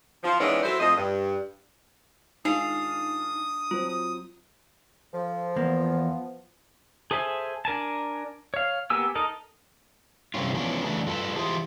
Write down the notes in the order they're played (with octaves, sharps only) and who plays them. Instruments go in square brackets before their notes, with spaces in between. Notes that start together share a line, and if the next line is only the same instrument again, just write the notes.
[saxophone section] F3
D#3 E3 G#3 B3 C#4 D4
F#3 E4 A4 C5
F2 F3 A3 D#5
G2
[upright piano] D#3 G#3 F4 [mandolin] D4 F5 [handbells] D#4 [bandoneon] D#6
[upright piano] F#3 C4 C5 [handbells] F4
[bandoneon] D#6
[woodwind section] F3 [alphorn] A4
[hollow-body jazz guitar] E2 A#3 [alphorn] B3
[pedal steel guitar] G#4 A4 C5 E5 G#5
D4 A#4 G#5 A5
C#5 F5
A#3 B3 G4 G#5 E6
D#4 A4 A#4 D#5
[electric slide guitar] G2 C3 E3 G3 C#4 F4
E3 F3 B3 C#4 D4
C#3 E3 A3 D4
G2 F4 A4 B4 A5
E3 F4 G4 G#4 C5